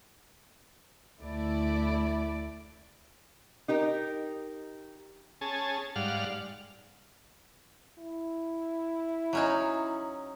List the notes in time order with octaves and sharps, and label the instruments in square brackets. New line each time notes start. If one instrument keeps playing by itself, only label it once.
[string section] D2 A3 E4 D5
[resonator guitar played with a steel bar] D#4 G4 A#4
[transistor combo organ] C#4 G#4 A5
G#2 G3 D5 F5 F#5 F6
[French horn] E4
[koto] F#3 C#4 D#4